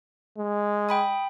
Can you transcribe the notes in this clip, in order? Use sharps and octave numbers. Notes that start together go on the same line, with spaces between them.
G#3
G5 B5 D#6